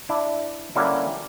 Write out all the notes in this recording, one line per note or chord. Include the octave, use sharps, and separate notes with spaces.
D4 E4
D3 G3 A#3 C#4 E4 F#4